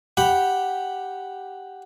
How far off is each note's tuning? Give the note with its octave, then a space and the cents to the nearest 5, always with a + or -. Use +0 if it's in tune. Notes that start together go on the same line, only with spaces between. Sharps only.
G4 +0 F#5 +0 B5 +0